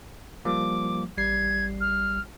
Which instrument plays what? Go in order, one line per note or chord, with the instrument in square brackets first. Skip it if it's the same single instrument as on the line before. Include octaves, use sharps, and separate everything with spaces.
[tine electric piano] F3 G3 A#3 [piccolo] D6
[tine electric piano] A1 G3 C7 [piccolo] G#6
[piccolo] F6